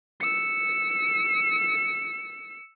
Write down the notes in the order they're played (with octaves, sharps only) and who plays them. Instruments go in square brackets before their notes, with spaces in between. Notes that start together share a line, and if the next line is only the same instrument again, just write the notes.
[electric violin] E6 C#7